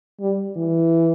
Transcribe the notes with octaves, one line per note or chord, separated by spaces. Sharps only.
G3
E3